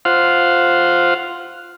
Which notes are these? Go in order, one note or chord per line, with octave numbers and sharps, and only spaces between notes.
F4 C5 F5 F#5